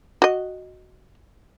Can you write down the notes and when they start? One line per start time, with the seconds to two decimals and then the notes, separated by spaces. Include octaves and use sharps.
0.22 F#4 D#5